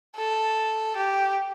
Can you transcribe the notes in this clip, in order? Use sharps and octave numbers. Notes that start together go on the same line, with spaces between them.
A4
G4